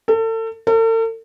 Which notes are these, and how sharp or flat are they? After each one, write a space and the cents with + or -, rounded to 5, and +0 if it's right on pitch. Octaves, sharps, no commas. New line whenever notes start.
A4 +35
A4 +45